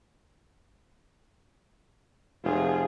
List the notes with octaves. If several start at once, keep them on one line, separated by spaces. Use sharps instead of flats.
F1 F4 G#4